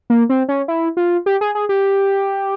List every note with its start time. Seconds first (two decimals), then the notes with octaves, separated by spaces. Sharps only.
0.10 A#3
0.29 C4
0.49 C#4
0.68 E4
0.97 F4
1.26 G4
1.41 G#4
1.55 G#4
1.69 G4